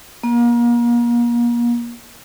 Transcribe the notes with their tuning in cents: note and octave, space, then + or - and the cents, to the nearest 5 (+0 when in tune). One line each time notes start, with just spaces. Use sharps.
A#3 +35